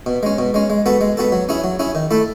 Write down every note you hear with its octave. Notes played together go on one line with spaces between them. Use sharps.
B2
G#3 C#4
B2
G#3 C#4
G#3
B3 F#4 A4
G#3
B3 F#4 A4
F#3
C#4 E4 G#4
F#3
C#4 E4 G#4
D#3
A3 E4 A4